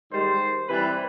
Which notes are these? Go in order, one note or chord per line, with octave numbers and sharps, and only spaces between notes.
G#2 D#3 G3 C5
C3 E3 G3 B4